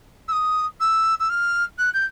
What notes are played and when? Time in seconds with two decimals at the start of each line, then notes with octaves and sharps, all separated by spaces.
0.28 E6
0.32 D#6
0.81 E6
1.20 E6
1.30 F6
1.79 F#6
1.94 G6